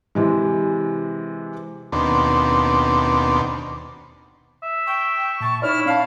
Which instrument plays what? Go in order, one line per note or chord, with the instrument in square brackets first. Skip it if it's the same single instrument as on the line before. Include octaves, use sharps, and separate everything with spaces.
[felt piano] C3 E3 G#3
[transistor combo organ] D#2 B2 C4 D4
[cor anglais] E5
[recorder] G5 [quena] C#6
[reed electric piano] A#2 [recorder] A5
[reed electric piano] D#4 C#5 D5 [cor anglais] E4 [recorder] F6
[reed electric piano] C#4 A5 [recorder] F5